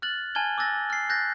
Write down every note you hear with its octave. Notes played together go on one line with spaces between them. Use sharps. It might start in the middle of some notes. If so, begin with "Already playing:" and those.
F6 F#6 A6 F#7
G#5 A5 F6 G#6 G7
D6 E6 F#6 A6 A#6
F6 C7
F#6 G6 A6 A#6